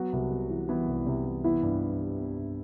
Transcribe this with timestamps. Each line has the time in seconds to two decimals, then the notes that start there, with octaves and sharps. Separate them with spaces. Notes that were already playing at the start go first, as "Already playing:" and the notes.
Already playing: F#3 B3 F#4
0.13 C2
0.31 C3
0.50 E3
0.69 E3 B3 E4
0.88 C2
1.06 C3
1.25 E3
1.44 E3 B3 E4
1.63 G2
1.82 E3
2.00 G3
2.20 B3
2.38 G2